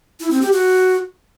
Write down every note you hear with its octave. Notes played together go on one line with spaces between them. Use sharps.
E4
C4
G4
F#4